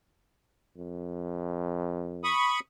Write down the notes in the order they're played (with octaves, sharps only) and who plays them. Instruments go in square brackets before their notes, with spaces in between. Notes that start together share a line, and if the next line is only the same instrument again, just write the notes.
[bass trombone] F2
[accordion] B5 C#6 D#6